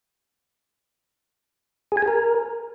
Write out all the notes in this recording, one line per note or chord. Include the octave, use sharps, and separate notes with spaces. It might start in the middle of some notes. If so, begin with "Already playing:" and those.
G#4
G#5
G#4
A#4